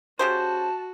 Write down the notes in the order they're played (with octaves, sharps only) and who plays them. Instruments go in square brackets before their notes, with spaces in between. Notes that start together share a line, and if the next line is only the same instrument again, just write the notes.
[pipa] C#3 G4 C5 [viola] F#4 [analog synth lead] A5